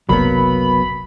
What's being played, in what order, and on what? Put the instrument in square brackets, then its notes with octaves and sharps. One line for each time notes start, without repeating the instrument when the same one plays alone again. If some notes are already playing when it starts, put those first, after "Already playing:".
[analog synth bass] F#1 [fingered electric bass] C2 [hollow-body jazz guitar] F#3 A#3 B3 [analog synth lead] B5